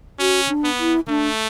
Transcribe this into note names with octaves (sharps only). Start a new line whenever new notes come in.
C#4 F#4
D4
B3
E4
A3 D4